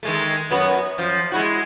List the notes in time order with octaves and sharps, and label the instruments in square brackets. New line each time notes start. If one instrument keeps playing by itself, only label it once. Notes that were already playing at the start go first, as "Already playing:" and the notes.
[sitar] D#3 G#3 A3
F#2 B3 F#4
F#2 F3
G#3 E4 F#4